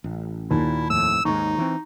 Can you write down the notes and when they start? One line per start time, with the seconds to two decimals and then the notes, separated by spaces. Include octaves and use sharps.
0.04 A1
0.51 D#2 A#2 E4
0.90 F2 A2 E6
1.25 D#2 G#2 G#3 D#4 C#6
1.58 E3 C4